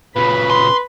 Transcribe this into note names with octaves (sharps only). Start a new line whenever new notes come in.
A#2 C#3 B4 B5
C6